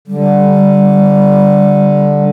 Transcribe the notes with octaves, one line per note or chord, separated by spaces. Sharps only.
D3 G3